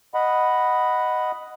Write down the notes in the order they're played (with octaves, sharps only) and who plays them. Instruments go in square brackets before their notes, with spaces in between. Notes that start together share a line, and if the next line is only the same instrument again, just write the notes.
[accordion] D#5 F#5 B5